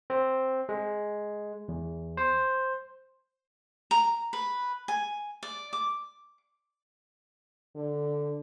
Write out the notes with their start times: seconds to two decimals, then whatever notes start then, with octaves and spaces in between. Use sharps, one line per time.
0.10 C4
0.69 G#3
1.68 E2
2.17 C5
3.91 A#5
4.33 B4
4.88 G#5
5.43 D5
5.73 D6
7.75 D3